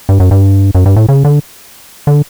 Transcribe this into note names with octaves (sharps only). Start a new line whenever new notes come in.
G2
F#2
G2
F#2
G2
A2
C#3
D3
D3